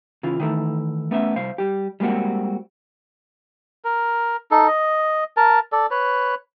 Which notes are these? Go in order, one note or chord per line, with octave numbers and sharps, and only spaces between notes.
C#3 E3 F4
D#3 E3 A3
A3 B3 C#4 E5
C2 C5 F5
G3 G4
G3 G#3 A#3 C4 F#4
A#4
D#4 A4
D#5
A#4 A5
A4 D5
B4 C#5